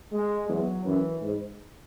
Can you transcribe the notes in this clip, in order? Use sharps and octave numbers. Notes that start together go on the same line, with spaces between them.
G#3
E2 F#3
F#2 E3
G#2